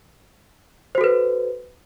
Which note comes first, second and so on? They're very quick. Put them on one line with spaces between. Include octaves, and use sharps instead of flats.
C5 F#4 A4 B4